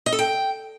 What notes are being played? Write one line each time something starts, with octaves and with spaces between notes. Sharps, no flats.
D#5
A4
G5